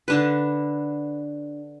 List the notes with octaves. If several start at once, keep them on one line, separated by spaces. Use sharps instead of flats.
D3 D4 B4